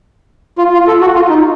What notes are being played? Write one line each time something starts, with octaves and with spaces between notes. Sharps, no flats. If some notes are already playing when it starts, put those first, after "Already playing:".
F4
F4
A4
F#4
F4
D#4